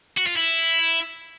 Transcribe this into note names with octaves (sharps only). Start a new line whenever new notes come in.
F#4
F4
E4